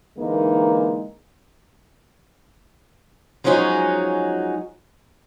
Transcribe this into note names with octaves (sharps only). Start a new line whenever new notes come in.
D3 E3 G#3 A#3 D#4
F3 F#3 G#3 C#4 D#4 F#4